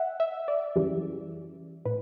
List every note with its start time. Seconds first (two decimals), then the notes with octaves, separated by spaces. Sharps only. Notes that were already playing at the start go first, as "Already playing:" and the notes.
Already playing: E5 F#5
0.20 E5
0.48 D5
0.76 F#2 C#3 E3 G3
1.85 A2 B4